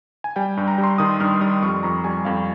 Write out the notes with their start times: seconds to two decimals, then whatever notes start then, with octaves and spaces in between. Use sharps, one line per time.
0.24 G#5
0.36 G3 G5
0.57 G2
0.68 A#5
0.78 G3
0.84 C6
0.98 D#3 D#6
1.20 G2 F6
1.41 G3 D#6
1.53 D#6
1.62 F2 C#6
1.83 F2 A#5
2.04 G3 G#5
2.25 F2 F5